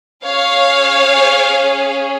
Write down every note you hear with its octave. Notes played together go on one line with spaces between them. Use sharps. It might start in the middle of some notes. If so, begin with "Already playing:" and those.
C#4 G#4 C#5 F5